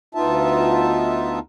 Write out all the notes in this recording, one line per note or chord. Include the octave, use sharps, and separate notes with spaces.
D2 B3 D#4 F4 E5 A5